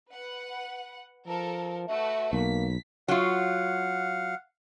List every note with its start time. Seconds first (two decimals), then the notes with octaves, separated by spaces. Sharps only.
0.11 B4 F#5
1.27 F3 A4 A#4
1.88 A3 F#4 B4 E5
2.33 B1 A#3 B6
3.08 F#3 F4 F5 F#5